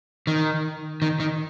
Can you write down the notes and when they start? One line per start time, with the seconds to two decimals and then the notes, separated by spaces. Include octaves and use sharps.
0.27 D#3
1.02 D#3
1.20 D#3